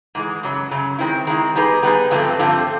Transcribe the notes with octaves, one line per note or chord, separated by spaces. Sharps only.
G#2 E3 G#3
F#2 C#3 F#3
F#2 C#3 F#3
D#3 G#3 C4 E4
D#3 G#3 C4 E4
G3 B3 D#4 G#4 B4
G3 B3 D#4 G#4 B4
G2 D3 F3 A3 C4
G2 D3 F3 A3 C4